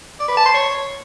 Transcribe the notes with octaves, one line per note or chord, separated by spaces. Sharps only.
D5
B4
A5
C6
C#5